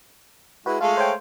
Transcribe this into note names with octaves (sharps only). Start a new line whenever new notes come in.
G#3 E4 F#4 B4
G#3 A3 F4 F5
C5 C#5 G5